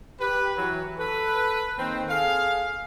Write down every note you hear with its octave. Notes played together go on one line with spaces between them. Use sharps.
G4 B4
E3 F#3
A4 B4
D#3 A#3 C4
G#4 A4 F5